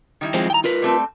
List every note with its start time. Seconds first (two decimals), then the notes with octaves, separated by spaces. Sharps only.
0.21 D#3 G3 E4
0.34 F3 G#3 C4
0.50 G5 A#5
0.64 F4 A#4 B4
0.82 G3 A3 C4